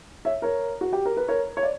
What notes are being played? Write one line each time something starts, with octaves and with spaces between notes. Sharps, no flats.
C#5 E5
A#4 C#5
F#4
G4
A#4
B4
A#4 C#5
C#5
D5